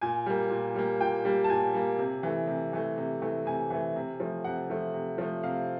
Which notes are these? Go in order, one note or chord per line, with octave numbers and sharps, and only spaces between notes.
A#2 G#5
G3 A#3
A#2
G3 A#3
A#2 G5
G3 A#3
A5
A#2 G#5
G3 A#3
C3
E3 A3
C3
E3 A3
C3
E3 A3
C3 G#5
E3 A3
C3
F3 A3
C3 F#5
F3 A3
C3
F3 A3
C3 F5